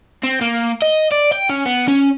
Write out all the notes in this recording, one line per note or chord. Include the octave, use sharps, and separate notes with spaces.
C4
A#3
D#5
D5
G5
C#4
B3
C#4